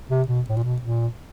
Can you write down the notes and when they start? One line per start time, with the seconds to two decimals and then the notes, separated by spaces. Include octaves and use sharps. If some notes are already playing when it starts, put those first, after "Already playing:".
0.10 C3
0.28 B2
0.49 A2
0.56 A#2
0.64 B2
0.82 A#2